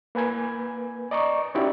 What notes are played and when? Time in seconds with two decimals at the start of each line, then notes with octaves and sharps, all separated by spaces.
0.15 A#3 B4 G#5 G#6
1.11 D5 D#5 A#5 C#6
1.55 C#4 D#4 E4 F#4 G4 D5